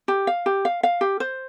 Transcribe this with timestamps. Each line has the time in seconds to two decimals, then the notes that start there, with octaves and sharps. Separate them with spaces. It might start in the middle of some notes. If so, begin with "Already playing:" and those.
0.08 G4
0.27 F5
0.46 G4
0.65 F5
0.83 F5
1.01 G4
1.20 C5